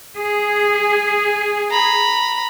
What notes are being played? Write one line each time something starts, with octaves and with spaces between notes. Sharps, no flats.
G#4
A#5 B5